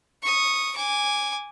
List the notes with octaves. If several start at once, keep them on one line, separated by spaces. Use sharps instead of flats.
C#6 D#6
G#5 D6